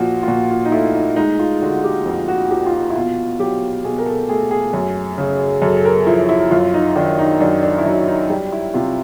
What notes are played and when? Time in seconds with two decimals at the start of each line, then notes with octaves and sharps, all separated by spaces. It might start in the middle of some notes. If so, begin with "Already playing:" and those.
Already playing: A#2 F3 F#4
0.23 F4
0.28 A#2 F#4
0.51 F4
0.65 D#4
0.72 A3 E4
0.94 D#4
1.16 G#3 D#4
1.39 F4
1.62 D3 F#4
1.84 G4
2.06 F2
2.28 F#4
2.51 F3 G4
2.66 F4
2.73 F#4
2.90 E4
2.96 B2 F4
3.39 F#3 G4
3.84 B2 G#4
3.98 A#4
4.06 A4
4.29 A3 G#4
4.51 G#4
4.73 F#2
5.18 C#3
5.62 F#2 A4
5.77 A4
5.85 A#4
6.06 F3 E4
6.29 E4
6.51 F#2 F4
6.74 D#4
6.96 D#3 D4
7.19 D#4
7.40 F#2 D4
7.63 D4
7.78 E4
7.85 F#3 D#4
8.08 D#4
8.30 G3
8.53 E4
8.74 C3 F4